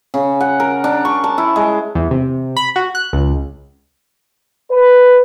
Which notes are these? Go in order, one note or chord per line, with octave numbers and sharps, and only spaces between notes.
C#3
F#5
A#4
D4
C#6
A5
E4
G#3
E2
C3
B5
F#4
F#6
C#2
B4